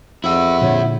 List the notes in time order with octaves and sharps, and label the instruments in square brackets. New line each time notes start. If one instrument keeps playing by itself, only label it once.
[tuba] F2 [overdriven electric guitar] E4 F#5 [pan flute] E6
[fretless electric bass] A#2 D3 F3 [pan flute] C#5